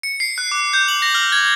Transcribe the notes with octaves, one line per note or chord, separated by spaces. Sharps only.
C#7
C7
F#6
D6
G6
F#7
A#6
F6
G#6